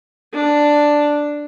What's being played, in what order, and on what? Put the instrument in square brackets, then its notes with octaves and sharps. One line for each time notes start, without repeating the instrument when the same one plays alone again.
[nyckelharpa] D4